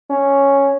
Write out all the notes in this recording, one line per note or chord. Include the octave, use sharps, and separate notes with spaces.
C#4